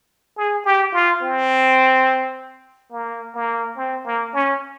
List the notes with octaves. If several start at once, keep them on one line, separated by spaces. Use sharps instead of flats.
G#4
G4
F4
C4
A#3
A#3
C4
A#3
C#4